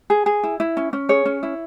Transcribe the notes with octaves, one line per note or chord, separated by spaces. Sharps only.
G#4
G#4
E4
E4
C#4
C#4
G#4 C#5
C#4
E4